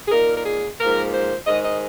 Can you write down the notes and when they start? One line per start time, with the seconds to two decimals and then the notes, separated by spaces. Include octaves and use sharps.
0.08 G#4
0.12 A#2 A#3 D#4 A#4
0.37 A#4
0.46 G#4
0.80 G#2 F3 A#3 A#4
1.14 C5
1.47 G#2 D#3 G#3 D#5
1.65 D#5